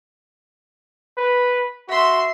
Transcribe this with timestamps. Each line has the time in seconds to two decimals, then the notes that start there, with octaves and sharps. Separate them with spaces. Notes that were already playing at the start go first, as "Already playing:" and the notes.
1.18 B4
1.89 F#4 E5 C6